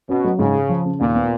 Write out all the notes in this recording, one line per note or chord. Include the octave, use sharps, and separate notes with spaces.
B2 C#4
F#3
G#2 C#3
G#4
F3
C#3
D#2 A#2
B3